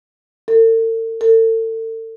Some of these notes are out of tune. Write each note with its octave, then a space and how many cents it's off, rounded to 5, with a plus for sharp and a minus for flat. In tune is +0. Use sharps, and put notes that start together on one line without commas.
A4 +45
A4 +35